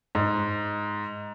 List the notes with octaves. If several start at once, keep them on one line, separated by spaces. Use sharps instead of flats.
G#2